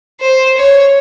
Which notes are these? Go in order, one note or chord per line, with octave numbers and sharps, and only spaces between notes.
C5
C#5